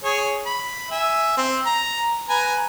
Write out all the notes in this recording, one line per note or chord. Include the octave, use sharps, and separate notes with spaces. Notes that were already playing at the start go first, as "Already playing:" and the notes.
G#4 C#5
B5
E5 G#5
C4
A#5
B4 G#5 A#5